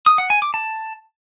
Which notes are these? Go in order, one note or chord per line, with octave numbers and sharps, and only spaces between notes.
D#6
F#5
G#5
D6
A5